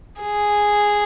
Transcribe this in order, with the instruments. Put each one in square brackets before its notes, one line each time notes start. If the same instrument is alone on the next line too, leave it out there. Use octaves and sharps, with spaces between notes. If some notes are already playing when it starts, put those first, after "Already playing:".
[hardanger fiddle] G#4